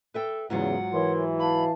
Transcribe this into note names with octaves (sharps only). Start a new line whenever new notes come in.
A4 B4 E5 G5
E2 G#2 C#3 F#3 F4 F#5
E3 A#4 C#5 C6
F5 A5 B5